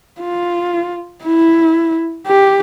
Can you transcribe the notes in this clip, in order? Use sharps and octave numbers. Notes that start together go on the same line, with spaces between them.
F4
E4
G4